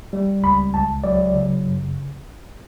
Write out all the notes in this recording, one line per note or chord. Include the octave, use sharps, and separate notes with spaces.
G3
C#2 B5
C#2 A5
F#3 D5
C#3
F#2